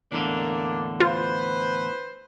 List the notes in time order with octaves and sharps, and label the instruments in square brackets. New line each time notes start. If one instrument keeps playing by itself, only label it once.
[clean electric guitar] E2 A2 D3 [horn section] A#3 D4
[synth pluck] F4 [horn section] B4 C5